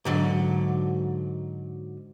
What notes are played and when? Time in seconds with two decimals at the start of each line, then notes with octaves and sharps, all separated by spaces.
0.05 G#2 D3 F#3